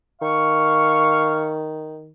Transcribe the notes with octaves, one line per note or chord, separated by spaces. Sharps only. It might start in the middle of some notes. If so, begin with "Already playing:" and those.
D#3 F5 C#6